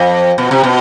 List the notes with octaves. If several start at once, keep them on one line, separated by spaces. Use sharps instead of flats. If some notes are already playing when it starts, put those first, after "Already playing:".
Already playing: F2
B2
C3
B2